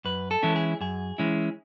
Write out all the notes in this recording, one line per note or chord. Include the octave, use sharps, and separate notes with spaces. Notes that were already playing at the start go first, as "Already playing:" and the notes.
F#2 B4
A4
E3 G#3 C#4 E4
G#4
F#2 G#4
E3 G#3 C#4 E4